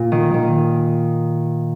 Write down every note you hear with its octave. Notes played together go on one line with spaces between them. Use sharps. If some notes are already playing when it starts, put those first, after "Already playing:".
Already playing: A#2 F4
D#3
D#3